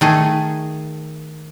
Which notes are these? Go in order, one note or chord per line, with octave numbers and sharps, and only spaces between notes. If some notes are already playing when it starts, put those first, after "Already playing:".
D#3 A3 G#4